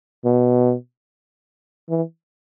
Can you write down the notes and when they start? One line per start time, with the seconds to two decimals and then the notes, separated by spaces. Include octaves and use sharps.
0.25 B2
1.89 E3